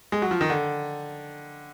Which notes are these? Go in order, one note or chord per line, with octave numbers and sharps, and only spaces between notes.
G#3
F#3
F3
D#3
D3